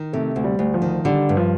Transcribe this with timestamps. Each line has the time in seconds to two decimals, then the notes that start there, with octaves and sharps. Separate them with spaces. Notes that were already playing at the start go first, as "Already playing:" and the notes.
Already playing: D#3
0.13 C3 A3
0.36 D2
0.44 G3
0.59 D2
0.74 F3
0.82 D#3
1.05 D3 G3
1.29 G2
1.37 F3